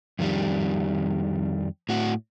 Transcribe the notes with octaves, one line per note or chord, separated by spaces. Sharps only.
F2 D#3 G3
A2 F#4